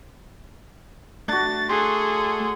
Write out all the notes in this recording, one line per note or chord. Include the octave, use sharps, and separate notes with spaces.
A3 D4 F#4 A6
G#4 A4 C6